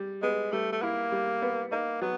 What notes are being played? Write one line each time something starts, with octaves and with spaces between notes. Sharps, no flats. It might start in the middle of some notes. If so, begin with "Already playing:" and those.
Already playing: G3
G#3 B3
G3 A3
A3
A#3 E4
G3
B3
A#3 D#4
F#3 B3